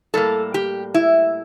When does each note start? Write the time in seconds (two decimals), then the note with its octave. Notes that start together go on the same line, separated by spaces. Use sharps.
0.14 A2 G3 A#3 A4
0.54 G4
0.94 E4